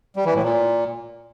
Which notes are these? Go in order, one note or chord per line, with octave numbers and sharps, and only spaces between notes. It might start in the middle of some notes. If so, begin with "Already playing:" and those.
G3
E3
A2
A#2